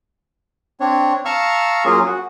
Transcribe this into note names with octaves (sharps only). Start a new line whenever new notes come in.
C4 D4 C#5
F5 A5 A#5 C#6 E6 F6
F#3 A#3 C#4 F4 G#4
F#4